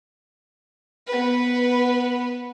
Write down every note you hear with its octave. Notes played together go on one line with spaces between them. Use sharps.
B3 B4